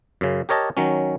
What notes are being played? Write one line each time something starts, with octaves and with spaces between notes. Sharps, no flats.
F#2 C#3
G4 A#4 C#5 D#5 A5
D#3 F#3 C#4